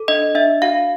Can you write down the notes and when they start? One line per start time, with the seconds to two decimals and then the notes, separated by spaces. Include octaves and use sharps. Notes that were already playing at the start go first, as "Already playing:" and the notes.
Already playing: A4
0.08 D4 D#5
0.35 D4 E5
0.62 F#4 F5